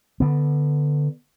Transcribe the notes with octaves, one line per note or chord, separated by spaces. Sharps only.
D3 B3